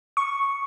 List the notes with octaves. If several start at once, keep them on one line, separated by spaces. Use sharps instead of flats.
C#6